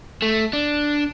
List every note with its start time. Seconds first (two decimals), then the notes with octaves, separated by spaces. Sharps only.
0.22 A3
0.53 D4